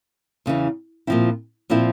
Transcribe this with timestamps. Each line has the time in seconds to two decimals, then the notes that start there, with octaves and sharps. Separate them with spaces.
0.46 E2 C#3 E3
1.07 A#2 F3 C4 E4
1.70 A#2 F3 C4 E4